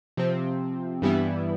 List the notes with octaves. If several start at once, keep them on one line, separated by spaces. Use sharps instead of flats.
C3 F3 C4
G2 E3 G3 B3 E4